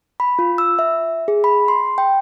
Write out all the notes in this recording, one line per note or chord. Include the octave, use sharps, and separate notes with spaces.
B5
F4
E6
E5
G#4
B5
C6
G5